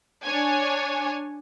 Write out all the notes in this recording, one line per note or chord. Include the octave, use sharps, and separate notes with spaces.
D4 C#5 G#5